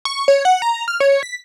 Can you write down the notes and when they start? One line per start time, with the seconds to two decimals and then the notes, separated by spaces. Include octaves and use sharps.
0.05 C#6
0.28 C#5
0.45 F#5
0.62 A#5
0.88 F6
1.00 C#5
1.23 B6